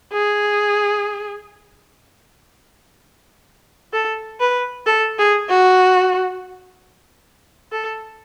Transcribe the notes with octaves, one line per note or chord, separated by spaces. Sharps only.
G#4
A4
B4
A4
G#4
F#4
A4